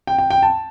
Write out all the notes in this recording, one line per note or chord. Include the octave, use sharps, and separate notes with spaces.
G5
G5
G5
A5